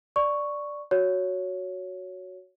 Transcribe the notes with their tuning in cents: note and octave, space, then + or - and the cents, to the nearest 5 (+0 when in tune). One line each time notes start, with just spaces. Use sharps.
D5 +0 C#6 +0
F#4 +0 C#5 +10